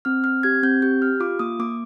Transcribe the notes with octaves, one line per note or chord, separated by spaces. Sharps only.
C4 F6
C4 F6
G4 G#6
C4 G6
G4 G6
G4 F6
F4 D6
A#3 D#6
A#3 D6